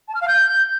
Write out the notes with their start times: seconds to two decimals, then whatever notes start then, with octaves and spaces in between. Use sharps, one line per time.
0.08 A5
0.15 F6
0.21 F5
0.28 G6